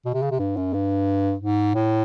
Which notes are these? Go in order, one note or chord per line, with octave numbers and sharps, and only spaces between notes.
B2
C3
C#3
C3
G2
F#2
G2
G#2
A2